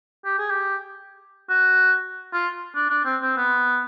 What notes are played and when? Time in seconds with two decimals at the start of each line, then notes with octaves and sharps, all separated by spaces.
0.25 G4
0.39 G#4
0.51 G4
1.50 F#4
2.33 F4
2.75 D4
2.90 D4
3.05 C4
3.22 C4
3.37 B3